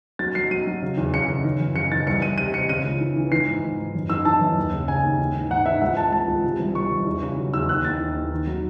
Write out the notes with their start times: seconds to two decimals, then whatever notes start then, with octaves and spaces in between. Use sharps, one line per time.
0.19 F#3 A6
0.35 F#3 C7
0.51 F#3 D#7
0.67 F#3
0.82 C#3
0.97 E2
1.14 C#3 C#7
1.29 C#3
1.45 E3
1.61 F#2
1.75 C#3 C#7
1.92 E3 A6
2.07 C2 C#7
2.22 C2 D#7
2.38 C3 D#7
2.54 C3 C#7
2.69 C#3 D#7
2.86 C#2
3.01 E3
3.16 E3
3.31 E3 C7
3.48 G#2
3.63 G#2
3.79 G#2
3.95 F#2
4.10 E3 E6
4.25 E3 A5
4.41 F#2
4.57 D#2
4.73 C#3
4.88 C#3 G#5
5.03 D#2
5.19 E3
5.35 G#2
5.50 G#2 F#5
5.66 E3 E5
5.82 C#2 F#5
5.97 C#2 A5
6.12 C#2 A5
6.28 C#2
6.44 C3
6.60 C2
6.75 C2 C#6
6.91 C2
7.06 E2
7.23 C#3
7.37 F#3
7.53 E2 E6
7.69 D#2 F#6
7.85 D#2 A6
8.00 E3
8.16 D#2
8.31 D#3
8.47 F#3